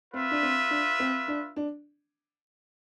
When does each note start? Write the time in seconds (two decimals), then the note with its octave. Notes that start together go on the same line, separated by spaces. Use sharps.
0.13 C4 F4 B4 E5
0.31 D4
0.43 C4
0.71 D4
1.00 C4
1.28 D4
1.56 D4